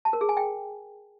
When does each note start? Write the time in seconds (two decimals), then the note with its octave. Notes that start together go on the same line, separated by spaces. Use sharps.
0.05 A5
0.13 A#4
0.21 G#4
0.29 G#5
0.37 G5